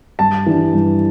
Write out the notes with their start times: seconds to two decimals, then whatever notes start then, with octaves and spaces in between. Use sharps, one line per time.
0.19 G2 A5
0.46 E3 G3 D4
0.73 G2